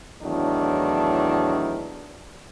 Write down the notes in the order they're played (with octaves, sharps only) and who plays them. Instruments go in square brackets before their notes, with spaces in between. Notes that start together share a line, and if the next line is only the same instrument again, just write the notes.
[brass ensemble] E2 A2 D#3 F#3 D4